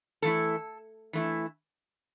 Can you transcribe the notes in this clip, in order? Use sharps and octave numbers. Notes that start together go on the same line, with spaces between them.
E3 A3 E4 A4
E3 A3 E4